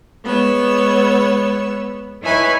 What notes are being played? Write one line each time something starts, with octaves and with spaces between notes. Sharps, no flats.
G#3 B3 C#5 E6
D#4 E4 B4 C#5 G#5 B5